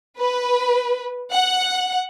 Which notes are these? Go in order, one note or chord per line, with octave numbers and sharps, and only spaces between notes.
B4
F#5